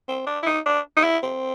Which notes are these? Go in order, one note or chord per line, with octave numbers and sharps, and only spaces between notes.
C4
D4
E4
D#4
D4
D#4
E4
C4